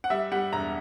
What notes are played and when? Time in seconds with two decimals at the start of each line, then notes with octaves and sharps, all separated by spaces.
0.04 F#5
0.10 G3 E5
0.32 G3 F#5
0.53 E1 A#5